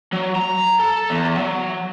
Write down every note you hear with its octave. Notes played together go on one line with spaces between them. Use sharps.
F#3
A#5
A4
E2
F#3